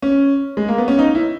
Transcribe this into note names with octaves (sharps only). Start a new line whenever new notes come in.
C#4
G#3
A#3
B3
C#4
D#4
E4